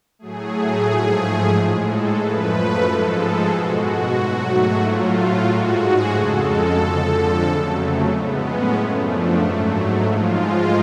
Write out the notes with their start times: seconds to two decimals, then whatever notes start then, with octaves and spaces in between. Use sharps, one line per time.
0.19 A2 F#3 A3 G#4
0.86 G#2 F3 A3
1.51 A2 G#3
1.84 A4
2.16 F#2 F3 A3 B4
2.81 G#2 F3 G#3 A4
3.15 G#4
3.48 B2 G#3 F#4
4.13 G#2 F#3 A3
4.78 A2 F#3 A3 F4
5.45 G#2 G#3 F#4
5.78 G#4
6.10 F2 C#3 G#3 A4
6.76 F2 D3 F3
7.41 F2 C#3 F#3 A3
8.07 A2 G#3 B3
8.40 C#4
8.73 F#2 F3 A3
9.05 D4
9.39 G#2 F#3 A3
10.04 G#2 F3 G#3 F4